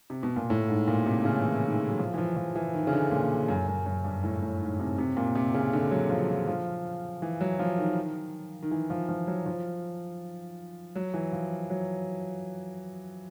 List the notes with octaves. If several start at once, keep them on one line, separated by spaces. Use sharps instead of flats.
C3
B2
A#2
A2
G#2
A#2
C3
C#3
E3
D#3
D#3
E3
F#3
F3
E3
F3
F3
E3
D#3
C#3
D3
A#2
F#2
F#2
F#2
G2
A2
A2
G#2
C3
C3
A#2
C3
C#3
D3
F#3
F3
F3
F3
E3
F#3
F3
D#3
D#3
E3
F3
F3
F#3
F3
F#3
E3
F3
F#3